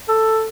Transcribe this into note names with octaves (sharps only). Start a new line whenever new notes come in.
A4